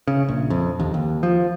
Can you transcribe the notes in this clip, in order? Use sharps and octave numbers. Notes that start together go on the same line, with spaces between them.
C#3
A#1
F2
D#2
D#2
F3